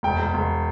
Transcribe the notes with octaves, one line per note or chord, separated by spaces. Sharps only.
E1 G5
E1
E1